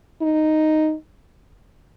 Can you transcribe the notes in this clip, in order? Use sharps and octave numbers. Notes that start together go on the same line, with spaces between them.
D#4